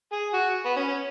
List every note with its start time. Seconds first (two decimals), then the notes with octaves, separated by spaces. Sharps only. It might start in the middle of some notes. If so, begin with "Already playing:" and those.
0.12 G#4
0.33 F#4
0.66 B3
0.77 C#4
0.88 C#4